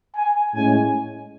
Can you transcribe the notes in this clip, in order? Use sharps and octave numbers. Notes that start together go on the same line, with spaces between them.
G#5
A2 G#3 C#4 G#5